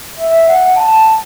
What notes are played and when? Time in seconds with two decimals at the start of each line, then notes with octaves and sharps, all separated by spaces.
0.20 E5
0.48 F#5
0.76 A5